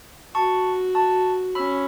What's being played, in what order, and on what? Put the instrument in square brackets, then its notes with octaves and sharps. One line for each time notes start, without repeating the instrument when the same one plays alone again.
[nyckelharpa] F#4 [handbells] A5 C#6
[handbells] A5 C#6
[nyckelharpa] C#4 [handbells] B5 E6